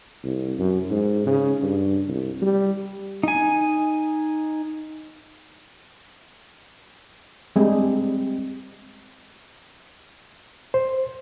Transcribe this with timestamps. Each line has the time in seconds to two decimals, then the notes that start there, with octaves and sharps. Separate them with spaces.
0.23 C2
0.58 F#2
0.91 G#2
1.26 C#3
1.62 G2
2.08 C2
2.42 G3
3.23 D#4 G#5
7.56 G3 G#3 C4
10.74 C5